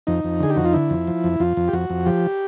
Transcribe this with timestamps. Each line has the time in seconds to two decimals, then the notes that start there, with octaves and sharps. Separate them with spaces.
0.07 F2 D#4
0.24 F2
0.40 D3 G#4
0.50 G4
0.56 F2 F#4
0.65 F4
0.73 D3 E4
0.90 F2
1.07 F3
1.24 F2
1.40 F2 F4
1.57 F2
1.68 G4
1.73 F2 F#4
1.90 F2
2.06 F3 G4